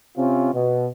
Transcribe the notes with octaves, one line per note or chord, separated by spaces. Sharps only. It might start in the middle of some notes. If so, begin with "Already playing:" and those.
C3 C4 C#4 F4
B2